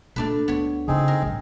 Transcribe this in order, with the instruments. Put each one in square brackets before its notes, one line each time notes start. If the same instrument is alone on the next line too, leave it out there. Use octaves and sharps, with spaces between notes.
[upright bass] A#2 A#3 [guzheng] A3 D4 B4
[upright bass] D2 [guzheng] B3 C#5
[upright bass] C#3 F4 [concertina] C4 D#4 G#4
[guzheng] A#4
[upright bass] A1 G2